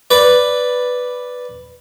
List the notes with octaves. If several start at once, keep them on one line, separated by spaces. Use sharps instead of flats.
B4 D5